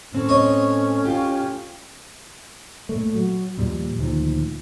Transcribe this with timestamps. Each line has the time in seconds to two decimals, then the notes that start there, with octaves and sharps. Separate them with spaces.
0.13 A2 C4 C#4 A4
0.29 C#5 D#5
1.05 F4 G4
2.89 A#2 A3
3.15 F#3
3.58 D#2 A#2 F3 G3
3.99 D2 A#2 D#3 F3